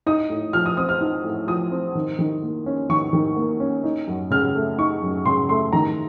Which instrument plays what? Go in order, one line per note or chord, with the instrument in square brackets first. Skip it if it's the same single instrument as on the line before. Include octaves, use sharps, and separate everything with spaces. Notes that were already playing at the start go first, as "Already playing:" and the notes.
[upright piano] D#4 D#6
A2
F3 F6
D#6
C4 D#6
F6
D#4
A2
F3 D#6
C4
D#3
D#3
A#3
C#4
D#3 C#6
D#3
A#3
C#4
D#4
F#2
C#3 F6
A3
D#4 C#6
F#2
C#3 C6
A3 C6
D#3 A#5